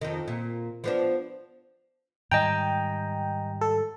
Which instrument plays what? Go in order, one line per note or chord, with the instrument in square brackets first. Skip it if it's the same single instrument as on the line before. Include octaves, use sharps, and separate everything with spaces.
[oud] F2 D#3
A#2
F3 B3 D4
[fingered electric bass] G#2 D#3 G3 [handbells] D#5 G#5 A#5 [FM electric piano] G5
[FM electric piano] A4